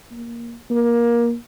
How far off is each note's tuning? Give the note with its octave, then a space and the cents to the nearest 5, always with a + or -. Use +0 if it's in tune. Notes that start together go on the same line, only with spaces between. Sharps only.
A#3 +10
A#3 +20